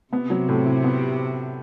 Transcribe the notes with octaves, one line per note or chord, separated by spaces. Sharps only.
C3 B3
F#3
A2
E4
B3